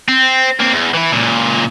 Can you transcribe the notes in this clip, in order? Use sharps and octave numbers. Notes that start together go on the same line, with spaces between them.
C4
A#3 C4
E2
E3 E4
C#2 A#2